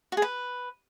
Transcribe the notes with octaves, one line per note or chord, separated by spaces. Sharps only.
F#4
G#4
B4